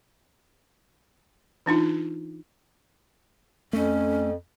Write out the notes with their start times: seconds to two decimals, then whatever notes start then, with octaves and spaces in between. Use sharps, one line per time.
1.66 E3 D4 D#4 F4
3.73 F2 A3 C#4